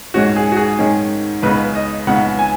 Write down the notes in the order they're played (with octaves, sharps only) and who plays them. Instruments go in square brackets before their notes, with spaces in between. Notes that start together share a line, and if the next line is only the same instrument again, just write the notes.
[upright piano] G#2 D#3 G#3 C#4 [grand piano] F#4
[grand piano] G#4
F#4
G#4
[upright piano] G#2 D#3 G#3 C#4
[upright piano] C#2 C#3 G#3 B3 D#4 [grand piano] B4
[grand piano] D#5
[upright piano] C#2 C#3 G#3 B3 D#4 [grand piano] F#5
[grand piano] G#5